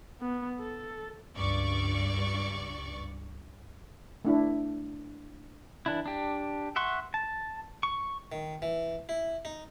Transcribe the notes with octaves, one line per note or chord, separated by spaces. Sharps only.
B3
A4
C#2 G2 D5 C#6
A3 D4 E4
E3 D4 E4
D4 G4
E5 F#5 C6 C#6
A5
C#6
D#3
E3
E4
D#4